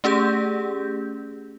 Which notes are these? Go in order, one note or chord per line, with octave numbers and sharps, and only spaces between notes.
A3 C#4 G4 G#4 G6